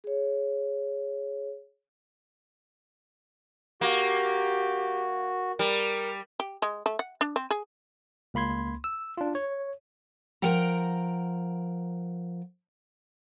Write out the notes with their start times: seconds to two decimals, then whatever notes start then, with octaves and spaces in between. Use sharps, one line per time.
0.04 G#4 C#5
3.81 A#3 F#4 G4
5.59 G3 A#4
6.40 G4
6.62 G#3
6.86 A3
6.99 F#5
7.21 D4
7.36 C4
7.51 G#4
8.34 C#2 A#3 B5 C6 G#6
8.84 E6
9.17 D4 F4
9.35 C#5
10.42 F3 A#4 F#5 G5 A#5